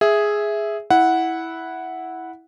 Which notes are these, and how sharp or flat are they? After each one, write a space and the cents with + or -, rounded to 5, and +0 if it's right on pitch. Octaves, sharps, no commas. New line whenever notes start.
G#4 +0 E5 +0
E4 -10 F#5 +0